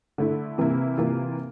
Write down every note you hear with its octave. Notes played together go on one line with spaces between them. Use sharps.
D3 A3 E4
C3 E3 A#3 E4
C3 E3 A#3 F4